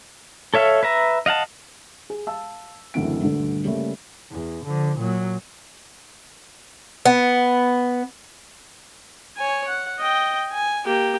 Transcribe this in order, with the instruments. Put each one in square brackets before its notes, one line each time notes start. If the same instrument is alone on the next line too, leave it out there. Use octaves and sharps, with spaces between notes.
[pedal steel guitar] A4 C#5 E5 F5
B4 E5 A#5
D#5 F5 F#5 A5
[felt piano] G#4
F5 A5 E6
F#1 D2 E3 C4 D7
D#1 D2 G2 D3
C#3 G3 A3 A#3
[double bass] E2
D3 F3
A#2 F#3
[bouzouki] B3
[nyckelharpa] C#5 G#5
F#5
D#5 G5
G#5
A#3 G4